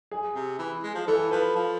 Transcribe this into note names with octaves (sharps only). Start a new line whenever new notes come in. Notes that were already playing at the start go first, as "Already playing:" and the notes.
G#4
C3
E3
G#3
F3
E3 A4
F3 B4
F3